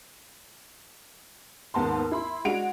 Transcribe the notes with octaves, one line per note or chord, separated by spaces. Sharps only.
D#2 G#2 B3 A5 C6
E4 B5 C6
G#3 D4 F#4 D7 F7